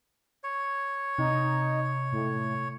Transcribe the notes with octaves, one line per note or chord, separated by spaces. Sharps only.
C#5
C3 D#4
A2